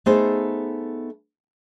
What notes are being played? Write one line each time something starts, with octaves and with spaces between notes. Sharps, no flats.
A3 B3 D#4 G#4 A4 C5